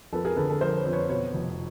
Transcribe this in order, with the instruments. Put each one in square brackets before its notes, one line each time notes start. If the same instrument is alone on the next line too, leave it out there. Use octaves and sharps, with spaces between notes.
[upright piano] F2 A4 B4
G#4 A#4
D3 A4 B4
A4 B4
F3 A#4 C5
B4 C#5
F2
B4 C#5
B2 B4 C#5
F1